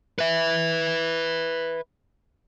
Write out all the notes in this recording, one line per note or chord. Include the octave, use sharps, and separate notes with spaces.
B4 E5